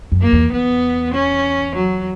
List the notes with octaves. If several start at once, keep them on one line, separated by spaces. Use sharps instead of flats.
F#2
A#3
E2
E2 B3
C#4
F#3